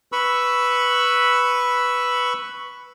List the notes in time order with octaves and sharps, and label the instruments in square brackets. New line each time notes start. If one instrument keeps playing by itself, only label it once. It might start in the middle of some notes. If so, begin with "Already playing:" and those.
[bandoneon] B4 B5 C#6 E6